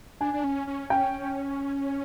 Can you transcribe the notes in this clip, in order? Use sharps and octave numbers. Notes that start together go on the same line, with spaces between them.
D4 G#5
D4
C#4
C#4
C#4 G5